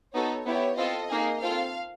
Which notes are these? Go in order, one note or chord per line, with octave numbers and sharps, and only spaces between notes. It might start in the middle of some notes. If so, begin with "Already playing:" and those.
B3 D#4 F#4 A4 C#5
B3 E4 G4 C#5
C4 F4 A4 D#5
A#3 D#4 G#4
C4 F4 A4 F5